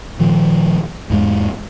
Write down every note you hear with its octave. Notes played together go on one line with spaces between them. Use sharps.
A#2 D#3 F3
E2 G#2 G#3